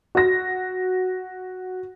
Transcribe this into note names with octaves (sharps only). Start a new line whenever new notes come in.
F#4 A#6